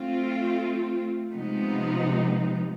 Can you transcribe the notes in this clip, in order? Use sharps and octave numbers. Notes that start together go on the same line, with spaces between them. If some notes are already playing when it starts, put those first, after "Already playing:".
Already playing: A3 C4 F4
C3 F3 G#3 B3 D#4